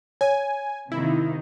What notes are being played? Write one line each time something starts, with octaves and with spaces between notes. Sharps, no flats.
C#5 G#5
C3 D#3 A#3 E4